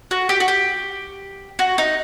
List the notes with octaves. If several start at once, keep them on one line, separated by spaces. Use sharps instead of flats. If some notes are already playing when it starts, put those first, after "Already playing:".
F#4
G4
F#4
G4
F#4
D#4